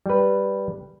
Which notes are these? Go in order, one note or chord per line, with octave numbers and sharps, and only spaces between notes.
G3 B4